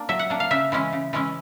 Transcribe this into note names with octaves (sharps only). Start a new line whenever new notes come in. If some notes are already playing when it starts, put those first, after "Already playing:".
Already playing: A#3 D4
F#3 E5
F#5
A#3 D4
F5
C#3 E5
E3 G#3 C#4 E4
C#3
E3 G#3 C#4 E4